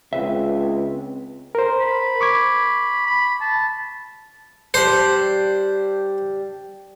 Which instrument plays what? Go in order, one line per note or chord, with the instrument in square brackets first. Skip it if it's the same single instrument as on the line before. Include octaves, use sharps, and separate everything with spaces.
[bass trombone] C#2 [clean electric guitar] C4 B4 E5
[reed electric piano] A#4 C5
[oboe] B5
[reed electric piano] C#6 D6 G#6
[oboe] B5
A5
[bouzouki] G3 D4 [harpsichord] C5